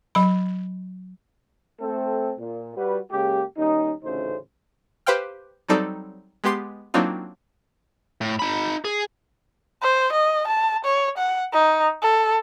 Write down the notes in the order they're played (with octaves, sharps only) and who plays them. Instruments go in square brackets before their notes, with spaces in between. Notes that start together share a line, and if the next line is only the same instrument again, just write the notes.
[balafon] F#3 B5
[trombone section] A3 C4 A4
A#2
G3 F#4 B4
C#3 G#3 A#3 G4
D#2 G3 C#4 D#4
A1 D2 C#3 A3 D#4 C5
[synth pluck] G4 B4 C5 F5 G5 F6
F#3 G3 C4 D#4 A4 D5
G#3 B3 G4 C6 C7
F#3 A#3 C4 D4 D#4 F4
[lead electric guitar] A2
D#4 B5
G#4
[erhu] C5
D#5
A5
C#5
F#5
D#4
A4